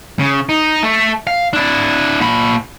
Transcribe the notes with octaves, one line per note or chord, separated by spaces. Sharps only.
C#3
D#4
A3
F5
D4 E4
A#2 B5